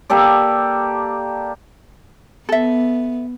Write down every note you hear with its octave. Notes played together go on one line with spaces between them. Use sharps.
A#3 G4 A4 D5
B3 A4 E5